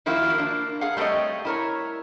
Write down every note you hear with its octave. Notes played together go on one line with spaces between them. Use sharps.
D#3 F3 A#3 E4 F#4
A#3 D4
G#4 A#4 F5 F#5
G3 A3 C4 C#5 D#5
E4 A#4 C#5